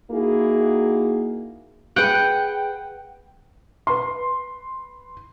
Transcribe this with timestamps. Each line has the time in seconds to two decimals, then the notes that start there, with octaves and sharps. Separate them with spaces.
0.11 A#3 D#4 E4 F#4 G#4
1.96 G#4 B4 F#5 G5
3.87 B4 C6